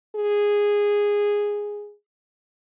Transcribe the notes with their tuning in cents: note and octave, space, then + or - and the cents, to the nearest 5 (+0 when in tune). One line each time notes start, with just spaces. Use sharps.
G#4 -10